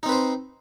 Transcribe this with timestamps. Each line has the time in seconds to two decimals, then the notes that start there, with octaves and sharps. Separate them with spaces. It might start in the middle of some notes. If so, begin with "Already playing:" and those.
0.03 D#4
0.06 C4
0.09 B4
0.12 C5